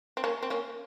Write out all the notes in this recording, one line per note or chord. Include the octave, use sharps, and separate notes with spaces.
C4
A#3 C#4
C4
A#3 C#4